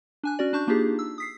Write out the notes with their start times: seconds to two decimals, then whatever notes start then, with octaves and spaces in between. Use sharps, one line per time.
0.23 D4 G#5 F#6
0.39 C#4 F#4 D5
0.53 D4 A5 C#6 G6
0.67 A#3 D4 D#4 F4 G4 G#4
0.99 E6
1.18 D#6 B6 C7